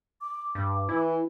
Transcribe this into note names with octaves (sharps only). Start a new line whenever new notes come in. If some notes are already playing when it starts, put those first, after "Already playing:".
D6
G2
E3 E4